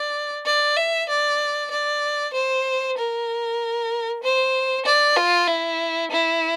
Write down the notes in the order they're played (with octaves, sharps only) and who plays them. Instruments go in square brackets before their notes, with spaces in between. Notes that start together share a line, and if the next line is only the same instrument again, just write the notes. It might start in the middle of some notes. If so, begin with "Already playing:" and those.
Already playing: [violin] D5
D5
E5
D5
D5
C5
A#4
C5
D5
F4
E4
E4